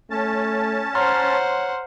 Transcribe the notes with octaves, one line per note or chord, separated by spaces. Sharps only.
A3 C#4 A5
C5 C#5 F#5 A#5 C6 F6